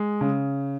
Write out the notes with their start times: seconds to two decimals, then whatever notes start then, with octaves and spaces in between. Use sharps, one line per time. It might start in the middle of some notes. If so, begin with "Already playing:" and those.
Already playing: G#3
0.21 C#3